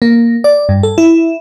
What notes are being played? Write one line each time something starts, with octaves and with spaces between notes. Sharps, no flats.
A#3
D5
G2
A4
E4